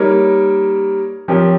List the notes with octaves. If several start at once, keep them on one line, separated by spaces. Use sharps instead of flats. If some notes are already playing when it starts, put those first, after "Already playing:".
Already playing: G3 A#3 D#4 A#4 C#5
F3 C4 G4 A#4 C#5